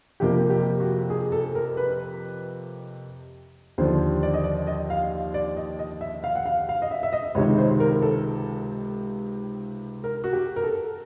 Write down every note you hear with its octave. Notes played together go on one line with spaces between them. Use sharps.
F2 C3 F3 A#3 G4
G4
F#4
G#4
A4
A#4
B4
D#2 D3 F3 C5
D5
D#5
D5
D#5
F5
D5
D#5
D#5
E5
F5
F#5
F5
F5
D#5
E5
E5
D#5
C#2 C3 D#3 C#5
C5
A#4
A4
A#4
F#4
G4
A#4
A4